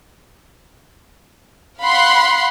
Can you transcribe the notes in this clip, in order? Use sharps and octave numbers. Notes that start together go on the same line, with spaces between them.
F5 F#5 B5 C6 F#6